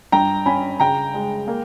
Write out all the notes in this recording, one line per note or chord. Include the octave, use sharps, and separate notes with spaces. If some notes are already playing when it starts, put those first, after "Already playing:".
G2 G5 A#5
C#4 G#5 B5
C#3 G5 A#5
G#3
A#3